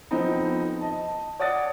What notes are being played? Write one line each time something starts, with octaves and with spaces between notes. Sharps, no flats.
F2 F3 B3 C4 D#4
D#5 A5
C#5 D5 F#5 D#6 A6